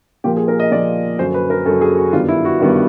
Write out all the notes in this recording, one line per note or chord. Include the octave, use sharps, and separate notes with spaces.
A#2 F3 A#3 G4
G#4
A#4
D#5
A#2 F3 A#3 D5
F#2 D3 F#3 C5
B4
A#4
F#2 D3 F#3 A4
G#4
F#4
G2 D#3 G3 B3 F4
E4
F#4
G2 D#3 G3 B3